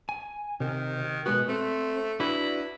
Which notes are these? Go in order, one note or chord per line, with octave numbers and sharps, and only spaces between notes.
G#5
C3 D#3
B2 G#3 B3 F#4
A3 C4
D4 E4 F#4 B4